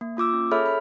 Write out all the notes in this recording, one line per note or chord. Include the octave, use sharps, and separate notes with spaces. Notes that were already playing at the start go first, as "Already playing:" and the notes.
A#3
A#3 F4 D6 E6
C#4
G#4 A4 C#5 E5 B5 F6
B5